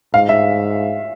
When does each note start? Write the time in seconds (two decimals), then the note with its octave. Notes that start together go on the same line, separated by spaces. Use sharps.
0.14 G#2 F5
0.29 E5